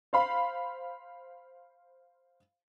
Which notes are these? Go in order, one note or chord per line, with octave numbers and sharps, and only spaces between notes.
C5 F5 B5